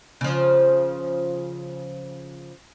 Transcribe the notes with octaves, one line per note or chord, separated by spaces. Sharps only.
C#3 F3